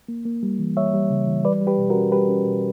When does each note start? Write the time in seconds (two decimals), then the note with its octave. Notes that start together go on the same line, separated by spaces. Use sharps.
0.08 A#3
0.25 A#3
0.43 G3
0.59 E3
0.76 G3 C#5 E5
0.94 G3
1.10 C#3
1.27 E3
1.44 G3 B4 D5
1.61 G3
1.67 G4 B4
1.78 B2
1.90 F#4 A#4
1.95 C#4
2.12 G3 G4 B4
2.29 C#4
2.46 B2